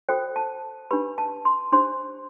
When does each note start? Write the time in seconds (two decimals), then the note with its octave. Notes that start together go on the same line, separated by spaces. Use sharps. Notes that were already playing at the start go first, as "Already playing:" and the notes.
0.09 F#4 A4 C5 G5
0.36 A5
0.91 D4 G4 B4 B5
1.18 A5
1.45 C6
1.72 D4 G4 C5 C6